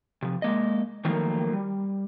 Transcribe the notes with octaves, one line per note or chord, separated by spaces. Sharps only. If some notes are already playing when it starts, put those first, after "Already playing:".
C3 F3
G#3 A#3 D#5
D#3 F3 F#3 A3 A#3 A#4
G3